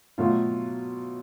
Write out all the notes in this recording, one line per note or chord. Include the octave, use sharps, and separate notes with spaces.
B2 F#3 A3 F4